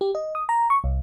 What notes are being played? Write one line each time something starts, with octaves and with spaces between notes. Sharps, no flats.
G4
D#5
D#6
A#5
C#6
C2